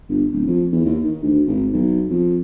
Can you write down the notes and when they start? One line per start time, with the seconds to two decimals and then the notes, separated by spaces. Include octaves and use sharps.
0.09 G1
0.32 D1
0.47 F2
0.72 E2
0.85 D#2
1.04 D#3
1.23 D2
1.47 G#1
1.73 B1
2.09 F2